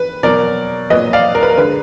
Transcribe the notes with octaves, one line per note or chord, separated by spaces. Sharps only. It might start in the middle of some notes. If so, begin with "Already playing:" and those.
Already playing: B4
B2 F#3 A#4 D5
A#2 F#3 B4 D#5
D5 F5
A#4
B4
A#4
D3 G#3 B4